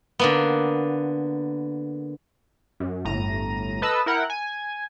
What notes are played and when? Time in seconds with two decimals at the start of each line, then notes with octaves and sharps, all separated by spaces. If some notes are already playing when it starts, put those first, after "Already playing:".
0.19 D3 A#3 B3
2.80 F#2
3.05 G1 A2 A#5 D#7
3.82 A4 B4 D#5 A5 B5 E6
4.06 E4 A#4 F#5 G5
4.30 G#5